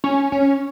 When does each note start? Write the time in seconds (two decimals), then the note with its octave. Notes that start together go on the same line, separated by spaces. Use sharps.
0.04 C#4
0.32 C#4